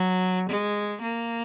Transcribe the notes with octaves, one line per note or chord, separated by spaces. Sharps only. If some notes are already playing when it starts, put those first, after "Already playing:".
Already playing: F#3
G#3
A#3